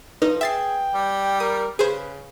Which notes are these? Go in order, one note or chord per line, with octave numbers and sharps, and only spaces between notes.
F3 D#4 B4
G#4 E5 G5 A6 C7
G3
A#4 D#6
C#3 G#4 B4 C5